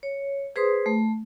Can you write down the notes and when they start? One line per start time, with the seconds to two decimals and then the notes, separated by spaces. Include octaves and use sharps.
0.03 C#5
0.56 G#4 B4 C5 C6 D#6
0.86 A3